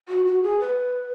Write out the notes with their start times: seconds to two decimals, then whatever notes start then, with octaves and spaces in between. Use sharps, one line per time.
0.08 F#4
0.25 F#4
0.43 G#4
0.60 B4